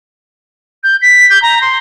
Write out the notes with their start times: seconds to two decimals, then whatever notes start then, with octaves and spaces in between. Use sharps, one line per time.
0.83 G6
1.01 B6
1.29 G6
1.42 A#5
1.61 C6